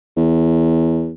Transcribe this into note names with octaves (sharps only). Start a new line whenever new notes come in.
E2